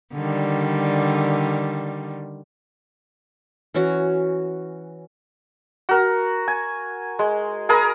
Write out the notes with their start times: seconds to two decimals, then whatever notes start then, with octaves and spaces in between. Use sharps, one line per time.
0.13 D3 D#3 G3
3.74 E3 C#4 F#4
5.89 F#4 A#4
6.48 G#5
7.19 G#3
7.69 G#4 A#4 A#5 B5